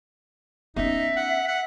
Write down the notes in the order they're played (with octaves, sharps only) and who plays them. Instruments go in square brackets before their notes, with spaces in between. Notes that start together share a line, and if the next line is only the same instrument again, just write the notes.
[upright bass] B3 C#4 [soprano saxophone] D#4 [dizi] E5
[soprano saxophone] F#5
F#5